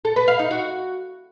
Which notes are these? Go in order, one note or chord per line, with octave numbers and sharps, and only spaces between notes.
A4
B4
F5
D#4
F#4